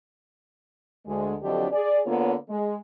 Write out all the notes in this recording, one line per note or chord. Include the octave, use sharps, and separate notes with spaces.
D2 G#3
F2 D3 F#3 D4 G4 D#5
G#4 D5
D3 A#3 B3 F4 C#5
G#3